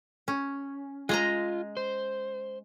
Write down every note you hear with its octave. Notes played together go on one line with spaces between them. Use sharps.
C#4
G#3 F4 D#5 A#5
C5